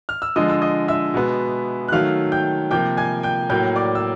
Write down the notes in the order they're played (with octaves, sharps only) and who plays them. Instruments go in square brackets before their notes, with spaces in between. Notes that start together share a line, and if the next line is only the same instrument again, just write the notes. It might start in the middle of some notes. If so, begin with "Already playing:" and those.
[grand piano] F6
E6
D3 F3 G#3 D#5 D#6
E6
D#5 D#6
E5 E6
B2 G#3 B3
F#6
D#3 F#3 A3 F5 F6
G5 G6
C3 F3 A#3 G5 G6
G#5 G#6
G5 G6
A2 F#3 A#3 G5 G6
D5 D6
E6